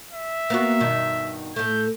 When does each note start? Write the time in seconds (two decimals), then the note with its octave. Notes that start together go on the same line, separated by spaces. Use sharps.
0.13 E5
0.50 A#3 B3 F#4
0.80 G2 B2 D#3
1.56 A2 A3 G6